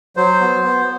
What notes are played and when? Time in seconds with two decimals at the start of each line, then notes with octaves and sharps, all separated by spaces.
0.17 F#3 C5
0.40 B3
0.64 B3